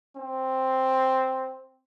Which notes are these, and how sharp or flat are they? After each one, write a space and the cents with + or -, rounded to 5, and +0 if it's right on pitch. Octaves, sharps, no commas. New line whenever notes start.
C4 +0